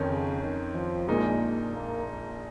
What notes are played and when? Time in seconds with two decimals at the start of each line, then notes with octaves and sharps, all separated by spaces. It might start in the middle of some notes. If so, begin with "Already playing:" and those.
Already playing: F2 D#3 C#4
0.09 C#3
0.42 D#3
0.75 F3
1.08 A#1 A#2 G#3 A#3 D#4 G#4
1.74 A#3